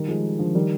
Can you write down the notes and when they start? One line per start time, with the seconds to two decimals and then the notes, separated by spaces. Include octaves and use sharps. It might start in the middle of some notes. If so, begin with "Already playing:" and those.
Already playing: D#3 G3
0.08 F3 G#3
0.39 D3 F3
0.55 D#3 G3